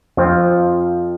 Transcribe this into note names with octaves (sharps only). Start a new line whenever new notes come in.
F2 F3 C4 F4